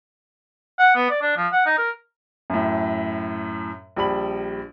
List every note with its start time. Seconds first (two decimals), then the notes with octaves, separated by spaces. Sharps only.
0.79 F#5
0.95 B3
1.10 D5
1.22 D4
1.37 F3
1.53 F#5
1.66 D#4
1.78 A#4
2.50 F#2 A2
3.96 A#1 G3 B5 F#7